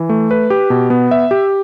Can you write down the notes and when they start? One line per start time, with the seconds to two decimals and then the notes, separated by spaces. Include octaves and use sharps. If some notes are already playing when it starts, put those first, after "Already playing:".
Already playing: E3
0.09 A3
0.31 B4
0.50 G4
0.70 B2
0.90 B3
1.11 E5
1.31 G4